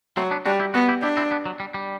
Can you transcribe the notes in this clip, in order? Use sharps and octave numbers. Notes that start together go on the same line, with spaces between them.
F#3 A3 C4
B3 D4
G3 D4 F#4
E4 G4
B3 F#4 A4
E4 G4
D4 E4 G4
C4 E4
B3 D4
F#3
G3
G3